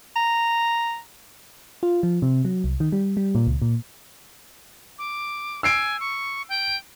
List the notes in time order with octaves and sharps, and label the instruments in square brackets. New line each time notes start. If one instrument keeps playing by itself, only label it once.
[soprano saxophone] A#5
[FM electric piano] F4
F3
C3
F#3
C2
D#3
G3
G3
A#2
C#2
A#2
[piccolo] D6
[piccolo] G#5 [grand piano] E6 C7 D7
[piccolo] C#6
G5